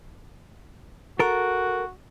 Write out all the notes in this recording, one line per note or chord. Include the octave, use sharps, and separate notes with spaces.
F#4 A4 A#4